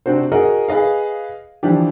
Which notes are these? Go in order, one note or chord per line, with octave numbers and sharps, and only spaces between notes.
C3 C4 D4 F#4 C5
F#4 G#4 A#4 D#5 F#5
G#4 B4 D#5 F5
E3 F3 D4 G4